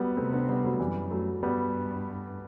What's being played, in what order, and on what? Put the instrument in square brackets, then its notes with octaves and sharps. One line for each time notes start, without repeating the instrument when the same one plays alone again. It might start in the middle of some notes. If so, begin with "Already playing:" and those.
Already playing: [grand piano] F#3 G3 B3
[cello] C3 [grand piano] A3 C4
[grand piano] B3 D4
G3 B3
F#3 A3
[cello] F#2 [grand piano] E3 G3
[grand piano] F#3 A3
[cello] G2 [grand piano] G3 B3